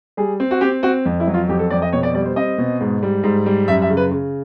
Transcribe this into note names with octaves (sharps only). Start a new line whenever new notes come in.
G3 G#4
C4
F#4
C4 G4
C4 F#4
F2
E4
F#3
F4
F2 G4
A4
F2 D5
D#5
B2 C#5
D5
G3 D5
C5
C4 D#5
B2
G#2
G3
G#2
G3
F#2 E5
E5
C#3
B4
C#3